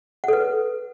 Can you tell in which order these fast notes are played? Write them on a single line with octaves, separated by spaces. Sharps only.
F#5 A4 B4